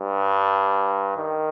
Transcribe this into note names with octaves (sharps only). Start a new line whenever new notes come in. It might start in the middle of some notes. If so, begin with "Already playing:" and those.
Already playing: G2
D#3